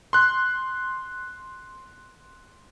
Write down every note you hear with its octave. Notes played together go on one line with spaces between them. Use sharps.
C6 F#6